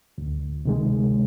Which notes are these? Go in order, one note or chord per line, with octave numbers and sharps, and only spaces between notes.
D2
C3 D#3 G#3